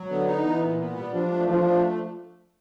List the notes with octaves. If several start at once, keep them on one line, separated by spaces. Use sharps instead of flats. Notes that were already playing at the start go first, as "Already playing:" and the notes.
Already playing: F#3
D3 B3
D#4
E3 B3
A#2
B3
G3
F3 D4
A3
F3 D4
A3